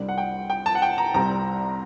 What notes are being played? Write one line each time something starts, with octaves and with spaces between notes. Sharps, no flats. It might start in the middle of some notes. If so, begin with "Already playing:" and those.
Already playing: C2 C3 G3 D4
F#5
G5
G5
A5
F#5
G5
A#5
C2 C3 G3 C4 A#5